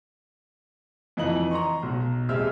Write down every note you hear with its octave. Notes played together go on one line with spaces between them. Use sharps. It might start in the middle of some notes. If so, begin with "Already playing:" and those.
F2 E3 D#4 D#5 F#7
A#5 C6 C#6
B1
D#1 G#3 C4 G4 E5 F6